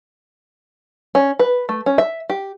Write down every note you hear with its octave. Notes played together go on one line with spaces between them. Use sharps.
C#4
B4
A3
C#4
E5
G4